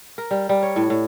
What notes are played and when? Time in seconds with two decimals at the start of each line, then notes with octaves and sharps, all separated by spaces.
0.18 A#4
0.31 G3
0.49 G3
0.63 C#5
0.76 A2
0.90 A2